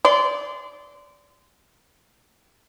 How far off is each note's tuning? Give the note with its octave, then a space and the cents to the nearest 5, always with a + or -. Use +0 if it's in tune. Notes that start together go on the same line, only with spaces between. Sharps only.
D5 -25 C6 -30